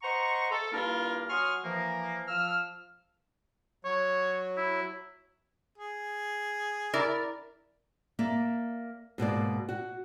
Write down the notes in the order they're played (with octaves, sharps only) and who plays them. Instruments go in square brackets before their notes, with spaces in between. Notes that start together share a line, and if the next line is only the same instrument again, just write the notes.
[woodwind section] C5 D#5 F#5 A#5 C#6
A4
G2 A#3 D4 E4 F4 A#4
F#3 G#5 C6 C#6 D#6 F6
E3 F3 A#3
F3 E6 F6
[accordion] F#3 [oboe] C#5
[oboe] E4
[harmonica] G#4
[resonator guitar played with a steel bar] E4 A#4 D5
[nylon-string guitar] A#3 D5 E5
G#2 B2 A#3 D5
F#4